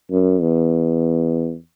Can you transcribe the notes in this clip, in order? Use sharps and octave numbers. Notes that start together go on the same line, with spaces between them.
F#2
E2